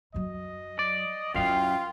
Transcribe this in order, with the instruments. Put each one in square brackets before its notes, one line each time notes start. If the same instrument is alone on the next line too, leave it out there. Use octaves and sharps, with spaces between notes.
[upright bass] F#2 F#3 [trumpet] D#5
[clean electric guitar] D5
[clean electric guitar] F#2 F5 [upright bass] C#4 E4 [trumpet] F4 [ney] G5